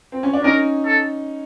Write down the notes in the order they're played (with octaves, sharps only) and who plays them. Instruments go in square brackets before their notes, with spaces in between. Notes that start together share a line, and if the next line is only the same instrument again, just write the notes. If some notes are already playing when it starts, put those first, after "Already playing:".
[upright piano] C4
C#4
D4
[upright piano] C#4 D#4 [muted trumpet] A#4
[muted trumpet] A4